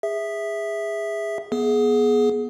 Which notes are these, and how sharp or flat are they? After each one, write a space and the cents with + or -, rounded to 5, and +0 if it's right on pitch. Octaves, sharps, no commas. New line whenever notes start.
G#4 -20 E5 -5
B3 -25 G#4 +20